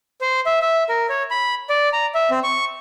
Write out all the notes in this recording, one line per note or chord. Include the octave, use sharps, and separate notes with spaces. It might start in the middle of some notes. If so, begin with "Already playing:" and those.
C5
E5
E5
A#4
C#5
B5
D5
A#5
E5
C4
C#6